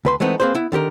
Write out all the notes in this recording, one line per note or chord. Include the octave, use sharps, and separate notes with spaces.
D2 B4 C6
E3 G#3 A3 B3 C4 D#4
A#3 C4 G#4 B4 C5
B3 E4
D3 D#3 G4 A#4